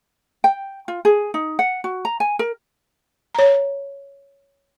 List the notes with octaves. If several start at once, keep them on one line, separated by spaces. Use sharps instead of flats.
G5
F4
G#4
D#4
F#5
F#4
A#5
G#5
A#4
C#5 A#5